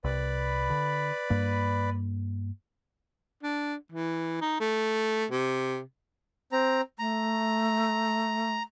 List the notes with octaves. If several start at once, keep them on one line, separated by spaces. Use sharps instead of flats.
C2 B4 D5 B5
D3
G2 A#3
D4
E3
D#4
A3
C3
C4 A#5
A3 A#5